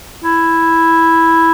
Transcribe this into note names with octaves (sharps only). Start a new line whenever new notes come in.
E4